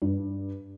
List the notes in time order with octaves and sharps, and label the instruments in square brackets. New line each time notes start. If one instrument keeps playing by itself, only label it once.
[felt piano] G2